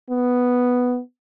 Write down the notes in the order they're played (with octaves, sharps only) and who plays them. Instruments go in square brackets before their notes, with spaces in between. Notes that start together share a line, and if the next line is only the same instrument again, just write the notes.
[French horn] B3